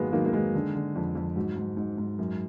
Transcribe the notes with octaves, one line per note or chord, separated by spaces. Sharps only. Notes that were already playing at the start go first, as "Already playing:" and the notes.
Already playing: G#2 D#3 F#3 G#3 A#3 B3
D#3 F#3 A#3
A#3
D#3 G#3
D3
D3
F2
F2
G#2 F#3
G#2
G#2
G#2
F#2